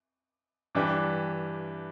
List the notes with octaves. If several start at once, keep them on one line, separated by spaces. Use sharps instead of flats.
G2 E3 G3 D4 G4